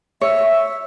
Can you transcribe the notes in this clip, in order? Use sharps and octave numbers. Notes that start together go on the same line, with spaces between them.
C#5 E5